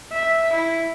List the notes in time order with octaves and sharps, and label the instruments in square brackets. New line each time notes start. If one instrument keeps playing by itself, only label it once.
[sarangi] E5
E4